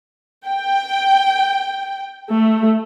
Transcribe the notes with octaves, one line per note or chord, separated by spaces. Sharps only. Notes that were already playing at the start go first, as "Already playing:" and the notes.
G5
A3